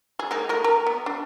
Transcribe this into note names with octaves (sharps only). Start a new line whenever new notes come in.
G#4
G#3 A#3 D#4
A3 A#4
A#4 A#5
B3
D4